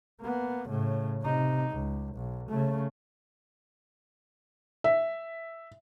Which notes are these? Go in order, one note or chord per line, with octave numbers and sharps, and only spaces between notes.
A#3 B3
A2 C#3
C3 D#4
C#2
B1
C#3 A3
E5